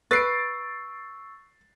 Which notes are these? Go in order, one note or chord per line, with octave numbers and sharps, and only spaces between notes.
B4 C#6 E6 A6 C7 D7